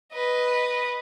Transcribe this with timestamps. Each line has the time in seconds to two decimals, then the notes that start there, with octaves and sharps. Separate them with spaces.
0.13 B4 D#5